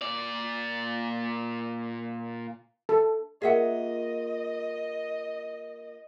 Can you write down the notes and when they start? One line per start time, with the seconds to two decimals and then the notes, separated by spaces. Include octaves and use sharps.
0.02 A#2 D5
2.89 A4
3.42 A#3 F4 G#4 D#5 E5 F#5